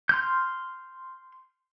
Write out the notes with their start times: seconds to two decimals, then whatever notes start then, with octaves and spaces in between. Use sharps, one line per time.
0.09 C6 F6 G6